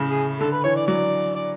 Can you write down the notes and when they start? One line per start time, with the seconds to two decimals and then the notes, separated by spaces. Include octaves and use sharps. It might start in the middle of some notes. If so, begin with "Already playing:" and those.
Already playing: A2 C#3
0.08 G#4
0.40 D3 A4
0.52 B4
0.63 E3 C#5
0.76 D5
0.87 F#3 D5
1.35 D5